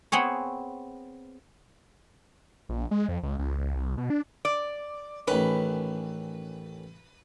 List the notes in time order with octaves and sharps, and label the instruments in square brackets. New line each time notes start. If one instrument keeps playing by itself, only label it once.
[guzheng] B3 C4 G#4 C#5
[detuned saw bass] A#1
G#3
F2
C#2
C#2
C#2
C2
B2
D4
[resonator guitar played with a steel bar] D5
[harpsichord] A1 D#3 C#4 [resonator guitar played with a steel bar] B4